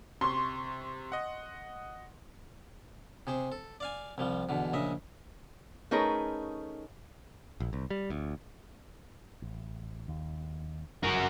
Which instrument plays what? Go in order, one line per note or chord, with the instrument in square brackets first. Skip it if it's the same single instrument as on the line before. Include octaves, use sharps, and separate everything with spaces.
[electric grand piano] C3 [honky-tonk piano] C6 C#6
[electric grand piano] D#5 F#5
[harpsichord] C3 G#4 C5
A4
D5 F5 G#5
C2 F3 G3
E2 B2 D3
A#1 C#3 D#5 E5
[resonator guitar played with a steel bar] A3 C#4 D#4 G#4 A#4 B4
[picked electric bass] A#1
C2
G3
D2
A1
D#2
[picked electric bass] G1 F#2 C#3 [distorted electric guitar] F#4 A#4